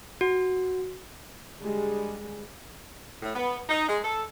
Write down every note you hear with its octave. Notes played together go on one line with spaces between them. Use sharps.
F#4
D3 G3 G#3
A2
B3
D#4
G#3
A4